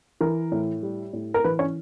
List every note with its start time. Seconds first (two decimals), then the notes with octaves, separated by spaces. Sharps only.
0.21 E3 A#4
0.52 A2
0.83 G3
1.13 A2
1.34 A#4
1.44 E3 B4
1.59 C#4 C#5